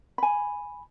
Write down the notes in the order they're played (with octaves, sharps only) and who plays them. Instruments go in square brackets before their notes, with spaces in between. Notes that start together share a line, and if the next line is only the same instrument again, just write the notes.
[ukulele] G#5 B5